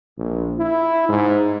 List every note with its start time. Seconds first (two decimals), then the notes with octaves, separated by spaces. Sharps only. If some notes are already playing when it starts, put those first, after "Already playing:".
0.18 A#1
0.59 E4
1.09 G#2